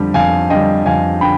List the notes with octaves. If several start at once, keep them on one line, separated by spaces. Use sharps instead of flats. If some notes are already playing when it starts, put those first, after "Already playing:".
Already playing: F2 D3 G3
F2 F5 G#5
D3 G3 D#5 G5
F2 F5 G#5
D3 G5 B5